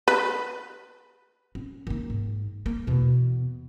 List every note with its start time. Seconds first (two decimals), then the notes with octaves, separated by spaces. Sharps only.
0.08 B4
1.55 C#4
1.87 D#3 A#3
2.10 G#2
2.66 A#3
2.87 E2 B2